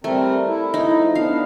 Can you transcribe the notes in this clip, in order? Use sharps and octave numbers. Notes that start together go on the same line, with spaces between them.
G3 A3 C4 A#4
E4
D#4
F3
B3 D4 F5